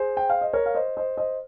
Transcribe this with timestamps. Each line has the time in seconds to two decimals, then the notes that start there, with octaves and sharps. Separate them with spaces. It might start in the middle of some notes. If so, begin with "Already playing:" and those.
Already playing: G#4 C5
0.17 G5
0.30 F5
0.41 D#5
0.53 A#4 C#5
0.66 F5
0.75 C5 D#5
0.97 C5 D#5
1.17 C5 D#5